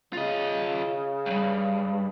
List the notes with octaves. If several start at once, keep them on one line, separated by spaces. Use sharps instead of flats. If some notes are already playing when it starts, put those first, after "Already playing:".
C#3 F4 D#5
C#2 G2